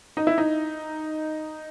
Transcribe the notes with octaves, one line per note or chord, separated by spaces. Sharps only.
D#4
E4
D#4